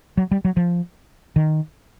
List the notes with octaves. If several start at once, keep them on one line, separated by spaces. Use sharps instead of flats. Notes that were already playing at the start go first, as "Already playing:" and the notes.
F#3
G3
F#3
F3
D#3